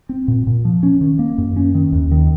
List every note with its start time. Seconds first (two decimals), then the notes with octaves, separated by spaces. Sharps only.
0.09 C4
0.28 A#2
0.47 A#2
0.65 F3
0.83 C#4
1.01 D#3
1.19 A#3
1.38 F#2
1.57 C#4
1.74 D#3
1.92 D#2
2.11 D#3